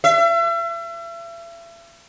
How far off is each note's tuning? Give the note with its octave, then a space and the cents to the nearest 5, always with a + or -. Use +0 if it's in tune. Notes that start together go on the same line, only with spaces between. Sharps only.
E5 +40